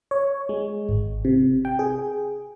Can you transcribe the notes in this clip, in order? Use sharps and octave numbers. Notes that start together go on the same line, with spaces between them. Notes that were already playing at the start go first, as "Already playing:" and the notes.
C#5
G#3
G#1
C3
G5
G#4